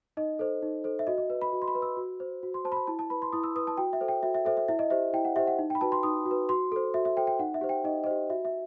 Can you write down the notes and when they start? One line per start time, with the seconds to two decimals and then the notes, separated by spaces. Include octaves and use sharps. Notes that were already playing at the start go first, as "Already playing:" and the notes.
0.17 D#4 D#5
0.39 A4 C5
0.62 D#4
0.84 A4 C5
0.99 E5
1.07 F#4 D#5
1.18 D#5
1.30 B4
1.41 B5
1.53 F#4
1.62 C6
1.68 B5
1.75 B4
1.82 E6
1.97 F#4
2.20 C5
2.43 F#4
2.54 C6
2.65 C5 A5
2.72 B5
2.76 A5
2.87 E4 A5
2.99 A5
3.10 B4 B5
3.22 C6
3.32 E4 D#6
3.44 E6
3.56 B4 D#6
3.67 A5
3.77 F#4 G5
3.93 E5
4.01 A4 C5
4.08 G5
4.23 F#4 E5
4.34 E5
4.45 A4 C5 E5
4.57 E5
4.68 E4 E5
4.79 D#5
4.90 G4 C5 E5
5.13 E4 G5
5.25 F#5
5.36 G4 C5 E5
5.47 F#5
5.59 D#4
5.70 G5
5.75 B5
5.81 F#4 B4 A5
5.92 C6
6.03 D#4 D#6
6.26 F#4
6.31 B4
6.49 F#4 C6
6.72 A4 C5
6.94 F#4 E5
7.05 E5
7.17 A4 C5 G5
7.27 G5
7.39 D#4 F#5
7.54 E5
7.61 G4 C5
7.69 G5
7.84 D#4 D#5
8.04 D#5
8.06 G4 C5
8.30 F#4 E5
8.45 E5